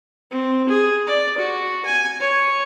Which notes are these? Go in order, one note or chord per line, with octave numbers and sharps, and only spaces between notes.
C4
G#4
D5
F#4
G#5
C#5